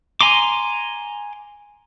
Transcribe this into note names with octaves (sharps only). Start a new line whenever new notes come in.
G#5 A#5 C6 D6